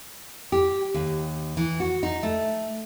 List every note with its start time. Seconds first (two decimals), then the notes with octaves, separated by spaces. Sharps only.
0.52 G4
0.94 D#2
1.57 E3
1.80 F#4
2.03 D#4
2.23 A3